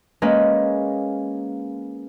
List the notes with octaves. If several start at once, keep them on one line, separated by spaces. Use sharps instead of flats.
G#3 A#3 C#4 B4